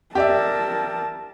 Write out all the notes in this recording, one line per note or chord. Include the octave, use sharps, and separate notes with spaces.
G4 A#4 D5 E5 A5